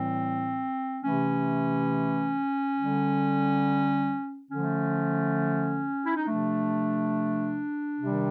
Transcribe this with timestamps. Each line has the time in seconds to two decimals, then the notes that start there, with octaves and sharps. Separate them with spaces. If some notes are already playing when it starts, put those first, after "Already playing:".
Already playing: A2 E3 G3 C4
1.02 C3 E3 A3 C#4
2.77 D3 G3
4.51 D3 F3 A3 C#4
6.06 E4
6.17 D#4
6.26 C3 F3 A3 D4
8.00 C3 D#3 G3